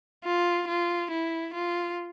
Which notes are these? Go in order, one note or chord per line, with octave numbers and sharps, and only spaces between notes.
F4
F4
E4
F4